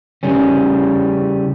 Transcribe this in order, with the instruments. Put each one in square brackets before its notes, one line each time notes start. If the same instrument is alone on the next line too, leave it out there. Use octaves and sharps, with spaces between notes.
[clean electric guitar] C#3 E3 G3 C#4